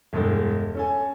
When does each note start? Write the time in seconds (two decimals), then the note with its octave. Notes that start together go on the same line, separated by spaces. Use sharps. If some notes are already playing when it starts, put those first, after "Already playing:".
0.13 E1 G2 G#3 A4
0.75 C#4 A4 G#5